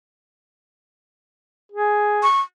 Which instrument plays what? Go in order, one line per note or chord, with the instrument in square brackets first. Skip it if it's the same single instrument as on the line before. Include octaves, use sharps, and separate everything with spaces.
[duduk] G#4
[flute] C#6